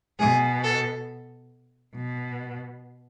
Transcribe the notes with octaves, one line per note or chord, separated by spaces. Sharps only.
B2 G#4
A4
B2